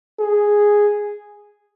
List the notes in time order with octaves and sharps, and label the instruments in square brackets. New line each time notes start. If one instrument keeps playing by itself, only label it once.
[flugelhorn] G#4